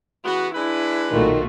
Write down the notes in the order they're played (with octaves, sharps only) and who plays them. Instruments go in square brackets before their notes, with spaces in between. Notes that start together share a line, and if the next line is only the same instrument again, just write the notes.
[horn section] C#3 E3 B3 [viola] F#4
[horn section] G#3 D4 B4 [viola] E4
[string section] B1 A#2 A3 [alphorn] D#3 [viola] F4 F#4